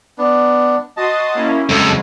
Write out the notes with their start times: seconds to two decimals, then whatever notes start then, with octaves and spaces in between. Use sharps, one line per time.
0.18 B3 D4
0.97 F#4 D#5 A5 C6 D#6
1.35 A#3 C#4 E4
1.69 F2 C#3 F#3 G#3 A4